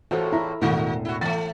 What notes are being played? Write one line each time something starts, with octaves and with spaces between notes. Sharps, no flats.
E2 A2 F4 F#4 A4 C5
E4 E5 A#5
E1 A2 D#3 F#4 A#4
E4 F#4
E3 A3 A6